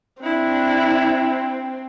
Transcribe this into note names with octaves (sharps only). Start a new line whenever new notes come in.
C4 D4 E4